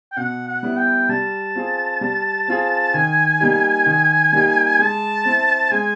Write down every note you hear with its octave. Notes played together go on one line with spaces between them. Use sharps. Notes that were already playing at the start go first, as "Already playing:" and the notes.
G5
B2 F#5
F#5
G3 B3 E4
G5
G3 A5
C4 F4 G#4
G3
C4 F4 G#4
D#3 G#5
G3 A#3 D#4 G4
D#3
G3 A#3 D#4 G4
G#3 A5
C4 E4
G#3 G#5